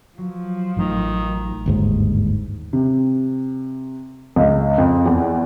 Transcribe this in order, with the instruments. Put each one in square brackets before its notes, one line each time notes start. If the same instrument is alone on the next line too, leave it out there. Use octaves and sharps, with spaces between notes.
[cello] F3 [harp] F#3
[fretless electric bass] A1 A2 [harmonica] D#3
[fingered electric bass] G1 D#2 G#2
[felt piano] C3
C#2
F2
E2